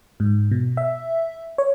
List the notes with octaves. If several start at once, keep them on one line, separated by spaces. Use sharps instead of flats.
G#2
B2
E5
C#5